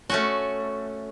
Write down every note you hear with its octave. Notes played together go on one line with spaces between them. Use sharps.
A3 C#4 F#4